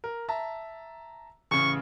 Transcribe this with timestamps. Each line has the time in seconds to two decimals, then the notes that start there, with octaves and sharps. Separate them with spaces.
0.04 A#4
0.29 E5 A5 A#5
1.51 A1 C#3 C#6